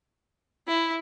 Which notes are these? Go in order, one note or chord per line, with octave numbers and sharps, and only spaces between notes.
E4